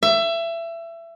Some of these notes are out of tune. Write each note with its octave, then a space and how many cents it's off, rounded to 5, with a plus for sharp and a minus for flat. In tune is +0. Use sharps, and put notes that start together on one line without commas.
E5 +25